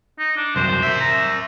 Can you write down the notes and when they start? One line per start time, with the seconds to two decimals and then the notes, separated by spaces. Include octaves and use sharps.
0.19 D#4
0.37 D4
0.56 C2 F#2 C5
0.83 A#4 E5
1.00 A#5